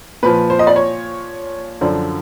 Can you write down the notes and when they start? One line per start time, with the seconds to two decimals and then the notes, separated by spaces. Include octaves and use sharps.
0.23 A#2 F3 B4
0.50 C5
0.59 D#5
0.67 D5
0.76 C#5
1.81 F#2 D3 F3 D5